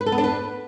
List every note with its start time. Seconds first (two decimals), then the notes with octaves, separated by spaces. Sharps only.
0.01 B4
0.06 A4
0.12 B3
0.18 D4
0.24 B4